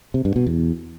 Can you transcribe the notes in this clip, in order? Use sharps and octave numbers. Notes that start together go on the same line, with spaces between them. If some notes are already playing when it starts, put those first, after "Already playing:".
C3
G2
B2
E2